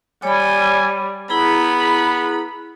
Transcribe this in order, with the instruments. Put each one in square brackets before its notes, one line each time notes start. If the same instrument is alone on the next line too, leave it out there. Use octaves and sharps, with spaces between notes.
[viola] G3 [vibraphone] C#5 B5 [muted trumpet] G#5
[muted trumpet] B3 [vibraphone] E4 G#4 A#5 [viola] B5